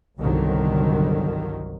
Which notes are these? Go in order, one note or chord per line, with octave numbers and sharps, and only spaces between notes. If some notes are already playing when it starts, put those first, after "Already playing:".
G1 C2 D3 D#3 F#3